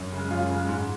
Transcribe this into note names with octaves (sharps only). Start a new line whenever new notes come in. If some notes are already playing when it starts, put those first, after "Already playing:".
Already playing: F#2
C#3 G#3
F#2 F4
C#3 G#3
G#2